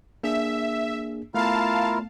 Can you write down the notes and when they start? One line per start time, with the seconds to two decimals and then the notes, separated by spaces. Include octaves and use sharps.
0.23 A#3 D4 G#4 E5
1.35 A3 B3 E4 F4 A#4 F5 A5